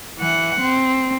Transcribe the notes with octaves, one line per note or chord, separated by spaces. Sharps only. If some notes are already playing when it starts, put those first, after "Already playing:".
E3 F#5
C4